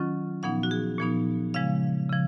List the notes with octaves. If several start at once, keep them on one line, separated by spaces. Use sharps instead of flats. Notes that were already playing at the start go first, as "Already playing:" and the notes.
Already playing: D#3 F#3 C#4 F4
A#2 F3 B3 D#4 F#5
F#4
G#4
A#2 F3 B3 D#4
C#3 F3 G#3 F5
C#3 F3